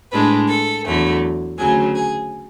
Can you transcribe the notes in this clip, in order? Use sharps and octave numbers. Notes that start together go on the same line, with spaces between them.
A2 G#3 D4 B4
A4
E2 D3 F#3 A3
D2 C#3 F#3 G#4
G#4